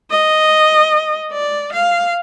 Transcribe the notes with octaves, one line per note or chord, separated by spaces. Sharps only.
D#5
D5
F5